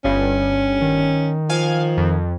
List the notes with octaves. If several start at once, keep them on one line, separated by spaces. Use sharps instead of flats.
G1 G2 C#4
D#3
F3 F5 G#5
F2